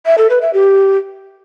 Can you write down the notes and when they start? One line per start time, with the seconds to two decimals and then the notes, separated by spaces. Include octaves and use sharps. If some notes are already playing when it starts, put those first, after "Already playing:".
0.06 E5
0.18 A4
0.30 B4
0.42 E5
0.54 G4